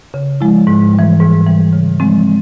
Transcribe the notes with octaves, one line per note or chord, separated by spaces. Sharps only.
C#3
F3 G#3 E4
G#2
G3
E3
G#2
E3 G3
C#3
F3 G#3 C4